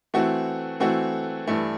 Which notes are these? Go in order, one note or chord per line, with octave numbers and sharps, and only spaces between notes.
E3 A3 C4 F#4
E3 A3 C4 F#4
G2 E3 A3